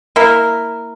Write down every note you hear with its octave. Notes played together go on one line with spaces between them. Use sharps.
A#3 E4 A#4